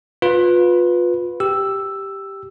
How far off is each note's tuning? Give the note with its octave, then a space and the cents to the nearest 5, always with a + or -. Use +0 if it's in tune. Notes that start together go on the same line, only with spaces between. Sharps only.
F4 +25 B4 +0
G4 +0 E6 +5